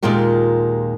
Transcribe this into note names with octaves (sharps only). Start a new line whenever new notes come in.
D#2 A#2 G#3 F4 G4 A#4